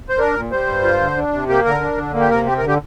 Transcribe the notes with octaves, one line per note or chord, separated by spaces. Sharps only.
C5
D4 A#4
A#2
G3 C5
G2
F4
D3
D4
C3
A#3 G4
D3 A#4
D4
D3
A#3
G4
C3 A#4
C4 G4
A#4
D3
G4